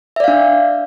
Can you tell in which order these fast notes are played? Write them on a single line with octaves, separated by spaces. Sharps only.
E5 D5 F5 D4